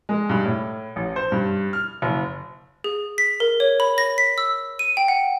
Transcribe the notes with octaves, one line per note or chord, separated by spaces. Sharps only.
G#3
G2
A2
A1
C5
G2
F6
F#1
G#4
B6
A#4
C#5
B5
A#6
B6
E6
D#7
G5
F#5